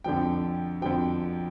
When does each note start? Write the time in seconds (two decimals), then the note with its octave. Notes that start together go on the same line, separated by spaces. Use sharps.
0.04 F2 D3 F3 G5
0.82 F2 D3 F3 G5